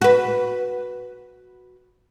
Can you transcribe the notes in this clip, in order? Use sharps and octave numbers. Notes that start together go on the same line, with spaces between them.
F#4 B4